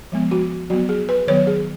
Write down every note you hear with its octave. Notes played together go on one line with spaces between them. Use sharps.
F3 G#3 B3
F#4
F#3 B3 F#4
G#4
B4
D#3 F#3 B3 C#5
G#4